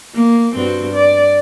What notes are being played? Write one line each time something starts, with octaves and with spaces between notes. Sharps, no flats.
A#3
G2 C4 F#4
D5